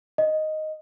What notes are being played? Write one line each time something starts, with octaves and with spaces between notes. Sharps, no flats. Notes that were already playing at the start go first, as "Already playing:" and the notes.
D#5